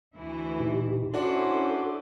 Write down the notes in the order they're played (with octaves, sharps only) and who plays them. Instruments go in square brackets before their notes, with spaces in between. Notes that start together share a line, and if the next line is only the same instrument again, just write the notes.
[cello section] D2 E3 E4
[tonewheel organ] A#2 D#4 G4
[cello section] C#4 E4 C5 [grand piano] D4 F#4 F#5 [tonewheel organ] A4 D6